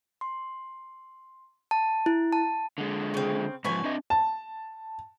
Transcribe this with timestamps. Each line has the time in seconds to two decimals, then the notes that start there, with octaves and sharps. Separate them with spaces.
0.21 C6
1.71 A5
2.06 E4
2.33 A5
2.78 D3 G#3
3.14 C#3 C4
3.65 G#2 E3 F3 B4 C#5 G#5
3.84 C4 D4 D#5
4.10 A5